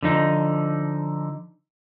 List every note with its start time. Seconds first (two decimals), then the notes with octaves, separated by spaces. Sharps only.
0.03 D3 F3 D#4